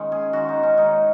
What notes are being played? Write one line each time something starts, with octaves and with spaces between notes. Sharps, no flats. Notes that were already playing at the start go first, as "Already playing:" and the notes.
Already playing: D#3 G#3 C#4
G#4
D#3 G#3 C#4 F#4
D#4
C#4
D#3 G#3 C#4 D#4